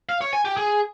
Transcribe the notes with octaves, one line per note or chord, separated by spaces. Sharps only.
F5
C#5
G#5
G4
G#4